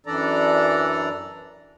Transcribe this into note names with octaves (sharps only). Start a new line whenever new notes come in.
F#2 E3 D4 A4 D5 A#5